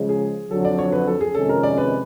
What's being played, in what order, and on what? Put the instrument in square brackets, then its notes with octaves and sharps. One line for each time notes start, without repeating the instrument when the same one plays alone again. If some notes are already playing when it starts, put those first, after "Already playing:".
Already playing: [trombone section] C#3 F3 G#3
[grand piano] G#4
[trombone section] F2 D3 F#3 [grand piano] A4
[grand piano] D5
C#5
B4
A4
G#4
[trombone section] F2 C3 D#3 G#3 C#4 [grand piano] A4
[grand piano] A#4
D5
B4